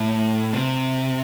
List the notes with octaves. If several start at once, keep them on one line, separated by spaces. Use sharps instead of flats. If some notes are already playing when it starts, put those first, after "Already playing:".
Already playing: A2
C3